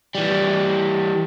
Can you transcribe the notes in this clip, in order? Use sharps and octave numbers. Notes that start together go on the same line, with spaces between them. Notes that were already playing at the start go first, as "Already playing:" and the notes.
E3 G3